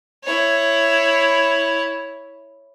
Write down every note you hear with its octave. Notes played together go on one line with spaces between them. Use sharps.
E4 C#5